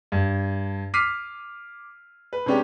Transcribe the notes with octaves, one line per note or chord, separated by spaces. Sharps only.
G2
D6 F6 B6 C7 D#7
B4
C3 G#3 B3 C#4 D4 G4